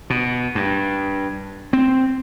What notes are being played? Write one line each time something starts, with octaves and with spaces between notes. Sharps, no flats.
B2
G2
C4